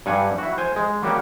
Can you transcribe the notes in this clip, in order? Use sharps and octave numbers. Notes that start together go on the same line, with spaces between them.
G2 G3 F#5 G#5
E4 F#4
C5 G#5
G#3
F#3 G3 A#3 C#4 F#4 G4